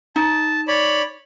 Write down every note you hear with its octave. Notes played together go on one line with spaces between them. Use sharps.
D#4 A5
C#5 D5 B5